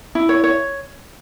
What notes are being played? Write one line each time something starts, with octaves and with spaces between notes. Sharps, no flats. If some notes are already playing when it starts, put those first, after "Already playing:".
E4
C#5
C#5